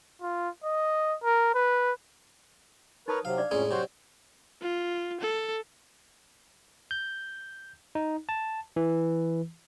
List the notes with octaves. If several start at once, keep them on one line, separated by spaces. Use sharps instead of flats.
F4
D#5
A#4
B4
D#4 A#4 B4 C#5 A5 D#6
C3 F#3 F5
D4 D5 D6
F2 A2 G#3 C#4 D#4 D5
C3 F#3 F#4 C5
F4
A4
G6
D#4
A5
E3